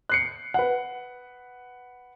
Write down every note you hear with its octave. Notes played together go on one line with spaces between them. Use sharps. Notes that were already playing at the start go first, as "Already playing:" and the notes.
F#6 C7 C#7
B4 F#5